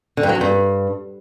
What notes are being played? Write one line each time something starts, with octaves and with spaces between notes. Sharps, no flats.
D3
G2
F#3
F#2
G2